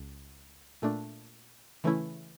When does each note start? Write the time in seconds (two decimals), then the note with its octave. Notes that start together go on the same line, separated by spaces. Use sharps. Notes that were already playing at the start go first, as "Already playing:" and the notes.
Already playing: C#2
0.82 A#2 A3 D4
1.84 C#3 E3 A3 C#4 E4